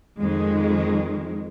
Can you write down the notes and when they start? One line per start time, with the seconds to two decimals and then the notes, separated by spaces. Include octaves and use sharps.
0.19 F2 D#3 G#3